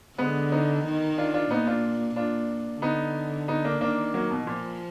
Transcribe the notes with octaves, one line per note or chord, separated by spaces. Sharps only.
D3 G#3 B3
B3 D#4
D#3
D4 F4
D4 F4
A#2 B3 D#4
D4 F4
A#2 D4 F4
D3 B3 D#4
B3 D#4
A#3 D4
D#3 A#3 D4
F#3 A#3
B2
A#2 F3